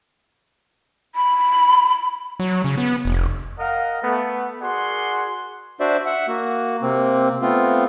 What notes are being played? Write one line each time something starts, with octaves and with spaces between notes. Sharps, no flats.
B5
F#3
C#3
B3
F1
A#4 D#5 F5 F#5
A3 B3
F#4 G#4 A#4 D5 F#5 C6
D4 F#4 C5 D5 E5
E5 F#5
A#3 F#4
C3 A#3 C4
A3 B3 C4 F4